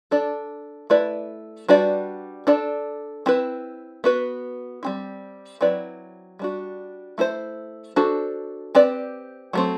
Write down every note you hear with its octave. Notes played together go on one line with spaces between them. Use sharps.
D4 A4 D5
A3 E4 B4 D5
G3 D4 F#4 B4 D5
D4 A4 D5
C4 E4 B4
B3 F#4 B4
G3 C4 E4
F#3 C4 E4 B4 D5
G3 D4 F#4
A3 E4 A4 C5
D4 F#4 A4 C5
C4 G4 B4 D5
F#3 A3 C4